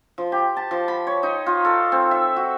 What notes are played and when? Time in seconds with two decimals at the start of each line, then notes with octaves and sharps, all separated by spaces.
0.18 F3
0.32 G4
0.56 A5
0.71 F3
0.88 B5
1.07 C#5
1.23 D#4
1.46 F4
1.65 A4
1.92 C4
2.11 E5
2.36 F#4